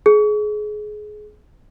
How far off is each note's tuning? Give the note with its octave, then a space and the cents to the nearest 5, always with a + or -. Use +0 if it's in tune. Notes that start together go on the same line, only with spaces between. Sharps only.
G#4 +25